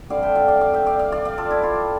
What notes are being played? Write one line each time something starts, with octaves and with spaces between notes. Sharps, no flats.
D3 G3 C4 D5 F5
E5 G5
D5 F5
D5 F5
D5 F5
E5 G5
D5 F5
D5 F5
D5 F5
D5 F5
F4 A4
E4
F4